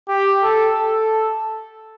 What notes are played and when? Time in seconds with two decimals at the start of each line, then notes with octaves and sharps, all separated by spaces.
0.08 G4
0.44 A4
0.79 A4